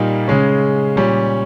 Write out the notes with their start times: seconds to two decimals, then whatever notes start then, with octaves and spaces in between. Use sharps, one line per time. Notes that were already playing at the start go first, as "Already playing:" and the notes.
Already playing: A#2 G3 A#3 D#4
0.27 C#3 G#3 C#4
0.96 A#2 G3 C#4